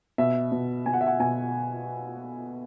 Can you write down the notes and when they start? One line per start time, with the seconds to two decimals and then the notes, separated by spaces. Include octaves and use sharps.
0.18 B2 E5
0.52 B2
0.86 B2 G#5
0.93 F#5
1.01 E5
1.07 F#5
1.20 B2 G#5